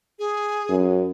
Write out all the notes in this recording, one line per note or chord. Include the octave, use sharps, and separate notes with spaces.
G#4
F#2